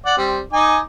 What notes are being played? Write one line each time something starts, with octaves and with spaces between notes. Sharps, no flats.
D5 F#5
G3 C4
D#4 G#5 D6